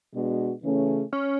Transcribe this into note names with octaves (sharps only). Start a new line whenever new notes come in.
B2 G#3 B3 D4 F#4
C#3 E3 A3 C#4 G#4
C#4